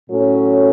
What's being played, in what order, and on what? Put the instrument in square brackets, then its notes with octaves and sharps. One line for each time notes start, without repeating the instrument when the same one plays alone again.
[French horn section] A2 F#3 C#4 A4